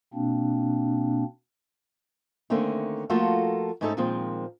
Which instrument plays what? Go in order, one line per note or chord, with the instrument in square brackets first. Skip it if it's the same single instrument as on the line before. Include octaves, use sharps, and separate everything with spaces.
[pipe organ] B2 A#3 C4 D4
[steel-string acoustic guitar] D3 D#3 A3 A#3 C4 C#4
F3 A3 A#3 F4 F#4 A4
G#2 A3 C#4 D#4 E4 A4
A#2 D#3 F3 G#3 C4